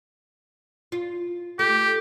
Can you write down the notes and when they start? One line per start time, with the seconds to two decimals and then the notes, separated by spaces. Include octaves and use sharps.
0.92 F4
1.59 A3 G4